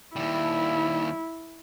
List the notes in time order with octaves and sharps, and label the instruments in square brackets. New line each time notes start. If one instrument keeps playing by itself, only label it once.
[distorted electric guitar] D#2 G3 [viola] E4